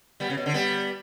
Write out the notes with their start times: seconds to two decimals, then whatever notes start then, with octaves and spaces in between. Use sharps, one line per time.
0.20 G3 B3
0.30 C#3
0.37 B2
0.46 D3
0.54 G3 B3